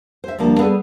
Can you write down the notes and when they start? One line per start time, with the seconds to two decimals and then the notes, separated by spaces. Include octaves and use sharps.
0.24 C5 E5
0.39 D2 F3 G3 A#3 A5
0.59 G3 B3 G#4 A4